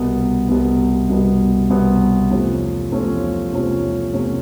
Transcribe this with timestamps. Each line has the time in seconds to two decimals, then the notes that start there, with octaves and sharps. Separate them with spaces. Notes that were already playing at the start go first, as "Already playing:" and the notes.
Already playing: C2 B2 G3 B3
0.48 C2 B2 G3 B3
1.09 C2 B2 G3 B3
1.70 C2 B2 G3 B3
2.31 E2 C3 F3 A3 C#4
2.92 E2 C3 F3 A3 C#4
3.52 E2 C3 F3 A3 C#4
4.13 E2 C3 F3 A3 C#4